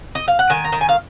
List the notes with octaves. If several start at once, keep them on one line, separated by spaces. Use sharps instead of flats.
D#5
F5
F#5
D#3 G#5
A#5
D#3
G#5
F5